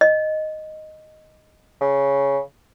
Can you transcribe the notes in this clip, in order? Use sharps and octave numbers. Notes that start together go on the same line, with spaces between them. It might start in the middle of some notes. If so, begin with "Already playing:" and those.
D#5
C#3